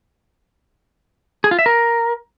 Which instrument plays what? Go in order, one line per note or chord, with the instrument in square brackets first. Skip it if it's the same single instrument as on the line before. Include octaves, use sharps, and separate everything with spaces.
[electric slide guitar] G#4
F4
E5
A#4